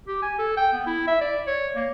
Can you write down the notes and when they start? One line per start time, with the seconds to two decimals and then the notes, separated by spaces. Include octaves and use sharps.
0.08 G4
0.22 G#5
0.39 A4
0.57 G5
0.73 B3
0.87 E4
1.08 E5
1.21 D5
1.47 C#5
1.76 A#3